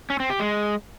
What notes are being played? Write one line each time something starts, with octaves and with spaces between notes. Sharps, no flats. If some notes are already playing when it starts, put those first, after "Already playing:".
C#4
C4
G4
G#3